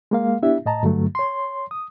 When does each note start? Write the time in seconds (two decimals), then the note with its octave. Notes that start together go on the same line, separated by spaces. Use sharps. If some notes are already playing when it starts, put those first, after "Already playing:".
0.11 G#3 A#3 F5
0.42 B3 D4 E4 G4 E5
0.66 A2 D#5 A5 A#5
0.83 G2 D3 F#3 A3
1.15 C#5 C6
1.71 D#6